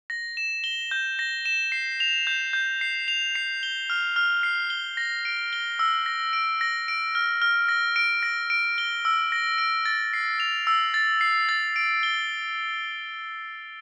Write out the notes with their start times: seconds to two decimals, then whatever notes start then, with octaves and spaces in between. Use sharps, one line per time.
0.10 A#6
0.37 E7
0.64 G7
0.91 G6
1.19 A#6
1.46 E7
1.72 C7
2.00 F7
2.27 G6
2.53 G6
2.81 C7
3.08 F7
3.35 C7
3.63 G7
3.90 F6
4.16 F6
4.43 C7
4.70 G7
4.97 A#6
5.25 D7
5.53 G7
5.79 E6
6.06 A#6
6.33 D7
6.61 A#6
6.88 D7
7.15 F6
7.42 F6
7.68 A#6
7.96 D7
8.23 A#6
8.50 D7
8.78 G7
9.05 E6
9.32 A#6
9.58 D7
9.85 A6
10.13 C7
10.40 F7
10.67 E6
10.94 A6
11.21 C7
11.49 A6
11.76 D7
12.03 G7